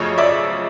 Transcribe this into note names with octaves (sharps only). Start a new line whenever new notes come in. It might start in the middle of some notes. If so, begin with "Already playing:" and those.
Already playing: F#2 C#3 F3 A3 C#5 D#5
D5 E5